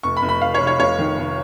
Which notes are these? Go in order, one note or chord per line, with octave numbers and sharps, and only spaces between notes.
F1 C#6
B5
F1
B5
F1 F5
C#5
F1
C#5
F1 C#5
D#3
F1